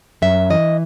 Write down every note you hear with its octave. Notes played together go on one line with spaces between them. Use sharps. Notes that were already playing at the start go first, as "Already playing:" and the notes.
F#2 E5
E3 D#5